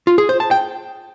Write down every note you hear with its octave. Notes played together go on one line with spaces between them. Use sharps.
F4
G#4
C5
A5
G5